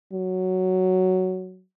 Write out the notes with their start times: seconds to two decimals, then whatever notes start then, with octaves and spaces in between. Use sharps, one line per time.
0.13 F#3